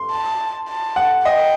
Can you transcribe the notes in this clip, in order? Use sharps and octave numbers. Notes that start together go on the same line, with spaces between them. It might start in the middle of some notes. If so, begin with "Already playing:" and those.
Already playing: C6
A5
A5
F#5
D#5 G5